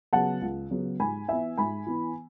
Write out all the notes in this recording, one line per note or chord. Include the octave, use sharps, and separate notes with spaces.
C#3 F#3 B3 F#5 A5
C#2
C#3 F#3 B3
G#2 G#5 B5
E3 B3 E5 G#5
G#2 G#5 B5
E3 B3